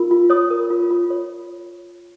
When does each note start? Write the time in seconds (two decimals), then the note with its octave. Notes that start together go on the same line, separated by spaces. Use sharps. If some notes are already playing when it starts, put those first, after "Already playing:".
Already playing: F4 A#4
0.11 F4
0.30 C#5 D#6
0.50 A#4
0.70 F4
0.91 F4
1.10 C#5